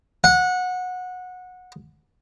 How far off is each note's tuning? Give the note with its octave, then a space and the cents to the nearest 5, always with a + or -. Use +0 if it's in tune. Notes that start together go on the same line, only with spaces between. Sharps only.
F#5 -20